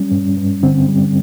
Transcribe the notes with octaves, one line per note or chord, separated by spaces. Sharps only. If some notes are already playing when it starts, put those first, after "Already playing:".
Already playing: G3 C#4
G2
G2
D3 C4
G3